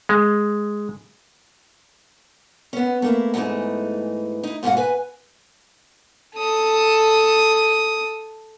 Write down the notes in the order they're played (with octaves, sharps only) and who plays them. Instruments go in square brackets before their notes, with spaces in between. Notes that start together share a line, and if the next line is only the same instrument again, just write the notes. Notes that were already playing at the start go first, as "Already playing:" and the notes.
[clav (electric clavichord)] G#3
[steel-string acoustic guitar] B3 C#4
A3 A#3 E4
E2 G#2 E3 A3 D#4
D#4 E4
G#2 B2 F#4 G4 F5 F#5
B4 G#5
[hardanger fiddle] A4 D#6